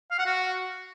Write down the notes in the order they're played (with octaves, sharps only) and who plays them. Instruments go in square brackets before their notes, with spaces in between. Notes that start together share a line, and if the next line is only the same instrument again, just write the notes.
[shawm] F5
F#5
F#4